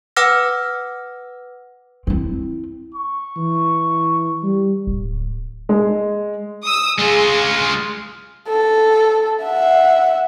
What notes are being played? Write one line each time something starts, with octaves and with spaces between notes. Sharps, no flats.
B4 F#5 D6 E6 F6 A#6
C4 E4
C#6
E3
G3
D1
G#3
D#6 E6
G#3 F4 G#4
A4
E5 F#5